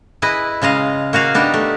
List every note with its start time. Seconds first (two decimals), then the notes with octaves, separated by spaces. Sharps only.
0.22 E4 G#4 B4 D#5
0.62 C#3 G#3 D#5 F5
1.13 A#3 F#4 G#4 F5
1.34 B3 D4 D#4 G4 D#5
1.54 A3